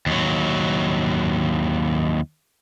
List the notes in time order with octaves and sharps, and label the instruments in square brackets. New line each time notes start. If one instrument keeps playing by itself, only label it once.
[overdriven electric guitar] D#2 F#3